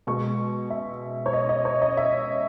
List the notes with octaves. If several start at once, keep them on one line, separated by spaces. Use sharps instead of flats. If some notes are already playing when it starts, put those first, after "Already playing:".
B2 G#3 C#6
E5
C#5
D#5
D#5
C#5
D#5
E5